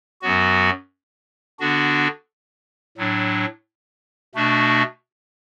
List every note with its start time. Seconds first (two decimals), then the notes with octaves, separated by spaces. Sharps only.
0.22 F#2 F#3 B3 F#4
1.60 D3 B3 D4 F#4
2.97 A2 F#3 D4
4.35 B2 A3 D4 F#4